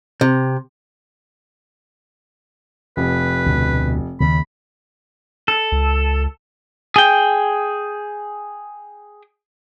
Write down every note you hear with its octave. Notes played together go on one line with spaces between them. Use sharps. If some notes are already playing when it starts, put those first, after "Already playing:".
C3
F1 B4
D2 B2
D#2 C#3 B5
A4
C#2
G#4 G5